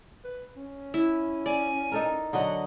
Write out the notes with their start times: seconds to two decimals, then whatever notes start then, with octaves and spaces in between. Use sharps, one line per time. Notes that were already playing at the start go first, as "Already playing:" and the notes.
0.24 B4
0.56 C#4
0.94 E4
1.46 D5 G#5
1.92 D#4 A4 A#4
2.33 D3 F#3 D#5 F#5